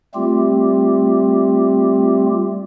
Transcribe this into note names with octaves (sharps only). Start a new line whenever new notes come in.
G3 A3 C4 F4 G4